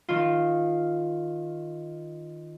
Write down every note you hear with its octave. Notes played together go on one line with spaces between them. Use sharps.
D#3 F4